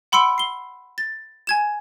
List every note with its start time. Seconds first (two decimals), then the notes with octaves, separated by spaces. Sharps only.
0.12 F#5 B5 C6 E6 C#7 D7
0.38 C7 G7
0.98 A6
1.47 G#5 G#6 E7